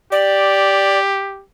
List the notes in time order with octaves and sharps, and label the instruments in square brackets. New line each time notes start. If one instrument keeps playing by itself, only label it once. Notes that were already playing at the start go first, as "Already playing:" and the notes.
[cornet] G4 [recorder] D5